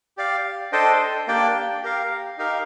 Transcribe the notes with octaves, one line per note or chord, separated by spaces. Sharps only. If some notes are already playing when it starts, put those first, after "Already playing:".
G4 D5 F5
D4 A4 C5 D#5 G5
A#3 D4 G4 D5 G5
G4 A#4 F5
D#4 G4 A#4 F5